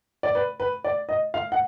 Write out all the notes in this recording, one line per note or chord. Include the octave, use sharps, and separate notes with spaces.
D5
B4
B4
D5
D#5
F5
F#5